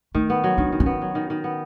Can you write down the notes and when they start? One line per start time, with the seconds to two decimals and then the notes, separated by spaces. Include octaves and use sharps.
0.15 D#3 A3
0.30 B3
0.44 F#3
0.58 D#3 D4
0.72 D#3
0.80 C#4
0.86 B3
1.01 F#3
1.15 D#3
1.30 D#3
1.44 B3